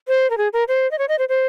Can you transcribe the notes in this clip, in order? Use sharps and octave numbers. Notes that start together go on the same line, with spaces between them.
C5
A#4
G#4
A#4
C5
D#5
C#5
D#5
C5
C5